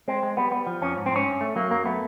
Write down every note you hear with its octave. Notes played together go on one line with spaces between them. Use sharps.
G#3 C4
G#3
G3 B3
G3 B3
F3
F2 C#4
G#2
C4
G#2 C#4
G2
A3
F#3 A#3
F#2 A#3
A3 B3